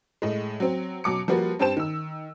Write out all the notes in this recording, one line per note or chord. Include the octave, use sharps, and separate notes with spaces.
A2 G#3
F#3 C4
B2 F#3 D6 C#7
F3 G3 A#3 F#4 B4
G2 C4 G4 C5 A5 E7
D#3 E6